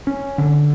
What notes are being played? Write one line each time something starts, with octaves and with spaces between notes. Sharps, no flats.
C#4
D3